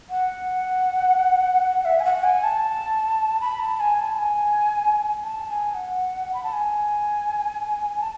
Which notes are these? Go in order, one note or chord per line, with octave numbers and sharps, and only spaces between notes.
F#5
E5
G#5
F#5
G#5
A5
B5
A5
G#5
A5
G#5
A5
G#5
F#5
B5
A5
G#5
A5